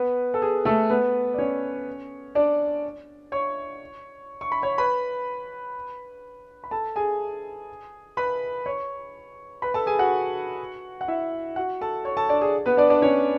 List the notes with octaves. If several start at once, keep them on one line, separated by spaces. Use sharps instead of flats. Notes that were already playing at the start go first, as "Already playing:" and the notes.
Already playing: B3 B4
A4
G#4
A3 A4
B3 B4
D5
C#4 C#5
D4 D5
C#5 C#6
C#6
B5
C#5 C#6
B4 B5
B5
A4 A5
G#4 G#5
B4 B5
C#5 C#6
B4 B5
A4 A5
G#4 G#5
F#4 F#5
F#5
E4 E5
F#4 F#5
A4 A5
C#5 C#6
A4 A5
D4 D5
G#4
B3 B4
D4 D5
D4 D5
C#4 C#5